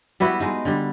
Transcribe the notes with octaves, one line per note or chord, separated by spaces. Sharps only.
G3 B3 E4 F#4
G#3 D#4
D3 G3